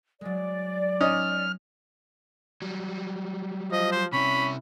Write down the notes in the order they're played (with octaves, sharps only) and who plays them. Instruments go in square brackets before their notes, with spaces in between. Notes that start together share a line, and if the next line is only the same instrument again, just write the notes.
[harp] F#3 G#3 [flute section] D5
[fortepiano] C#4 D#4 D#6 [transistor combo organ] F6
[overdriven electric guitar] F#3 G3
[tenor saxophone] F3 [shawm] D#5
[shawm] C5
[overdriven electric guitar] C3 E4 [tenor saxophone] C#4 [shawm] B5